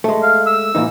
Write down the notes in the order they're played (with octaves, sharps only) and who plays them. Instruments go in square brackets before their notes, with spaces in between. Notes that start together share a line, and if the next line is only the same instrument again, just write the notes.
[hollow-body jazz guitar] G#3 A3
[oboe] F5
E6
[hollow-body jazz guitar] A#2 E3 D#4